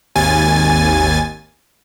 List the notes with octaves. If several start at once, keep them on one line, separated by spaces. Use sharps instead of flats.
G#1 D#2 G#5 A6